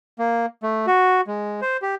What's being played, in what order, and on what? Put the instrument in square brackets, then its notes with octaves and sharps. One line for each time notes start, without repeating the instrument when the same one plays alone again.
[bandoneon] A#3
A3
F#4
G#3
C5
G4